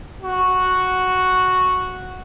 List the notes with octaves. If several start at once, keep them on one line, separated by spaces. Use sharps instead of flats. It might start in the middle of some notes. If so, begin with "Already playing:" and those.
F#4